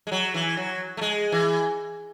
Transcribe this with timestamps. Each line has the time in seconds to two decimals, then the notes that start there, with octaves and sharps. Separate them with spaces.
0.07 G#3
0.12 F#3
0.34 E3
0.57 F#3
0.97 A3
1.01 G#3
1.32 E3